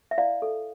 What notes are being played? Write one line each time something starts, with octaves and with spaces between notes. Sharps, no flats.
E5
E4 D5 F5
A4